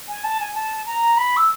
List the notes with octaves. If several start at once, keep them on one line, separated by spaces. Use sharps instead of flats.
G#5
A5
G#5
A5
A#5
B5
E6